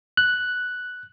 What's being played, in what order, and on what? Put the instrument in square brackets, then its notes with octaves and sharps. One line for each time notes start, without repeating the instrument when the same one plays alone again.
[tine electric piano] F#6